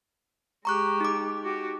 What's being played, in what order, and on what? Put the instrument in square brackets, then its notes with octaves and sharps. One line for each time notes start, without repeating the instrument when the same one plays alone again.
[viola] G#3 G4 [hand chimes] A#5 C#6 F#6
[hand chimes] D#4 D6
[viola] F#4 G4